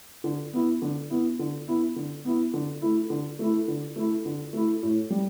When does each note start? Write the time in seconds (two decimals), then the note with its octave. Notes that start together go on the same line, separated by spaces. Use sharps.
0.24 D3
0.53 B3 E4
0.82 D3
1.10 B3 E4
1.39 D3
1.68 B3 E4
1.96 D3
2.25 B3 E4
2.54 D3
2.82 A3 E4
3.10 D3
3.39 A3 E4
3.68 D3
3.96 A3 E4
4.25 D3
4.53 A3 E4
4.83 A2
5.10 G3